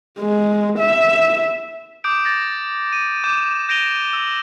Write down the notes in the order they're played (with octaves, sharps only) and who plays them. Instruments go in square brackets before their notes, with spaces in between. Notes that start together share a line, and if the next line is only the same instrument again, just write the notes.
[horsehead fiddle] G#3
E5
[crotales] D6 D#6 G6 D7
A6 A#6
D#7
D6 G6 E7
G6 A#6 D7 D#7 F7 G7
E6